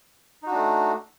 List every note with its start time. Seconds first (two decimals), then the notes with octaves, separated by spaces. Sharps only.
0.43 D#4
0.47 F#4
0.51 D4
0.55 A3